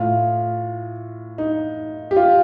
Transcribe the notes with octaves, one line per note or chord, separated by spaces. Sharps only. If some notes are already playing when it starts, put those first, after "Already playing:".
Already playing: A2 F4
D#4
G4
F4